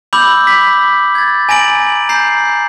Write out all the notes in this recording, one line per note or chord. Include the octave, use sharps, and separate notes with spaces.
B5 D6 E6 G6 F#7
B6
G#6 A6
G#5 A#5 A#6 D7 F#7
A#5 G6 C7